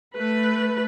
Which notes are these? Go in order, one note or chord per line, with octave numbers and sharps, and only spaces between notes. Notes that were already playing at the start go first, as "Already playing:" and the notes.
A3 B4